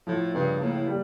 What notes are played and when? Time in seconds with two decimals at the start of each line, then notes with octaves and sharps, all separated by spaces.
0.06 A2 F3
0.34 G2 C#3
0.60 A2 A#3
0.87 G3